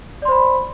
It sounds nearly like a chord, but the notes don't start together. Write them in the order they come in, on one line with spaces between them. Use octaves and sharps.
D5 C6 C5 B5